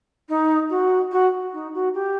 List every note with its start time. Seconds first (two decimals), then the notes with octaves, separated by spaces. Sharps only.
0.29 D#4
0.70 F#4
1.12 F#4
1.53 D#4
1.74 F#4
1.94 G4